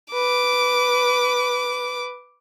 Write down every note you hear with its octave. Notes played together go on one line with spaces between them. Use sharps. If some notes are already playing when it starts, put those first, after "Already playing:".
B4 D6